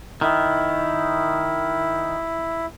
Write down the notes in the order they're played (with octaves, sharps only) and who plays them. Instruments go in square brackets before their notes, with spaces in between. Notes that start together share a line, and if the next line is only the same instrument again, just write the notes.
[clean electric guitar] D#3 [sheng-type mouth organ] E4